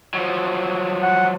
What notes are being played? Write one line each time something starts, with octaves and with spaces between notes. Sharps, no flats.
F3 F#3
F#5